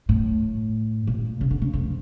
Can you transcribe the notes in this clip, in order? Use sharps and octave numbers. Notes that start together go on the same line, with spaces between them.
A2
A#2
C#3
D3
C#3
F2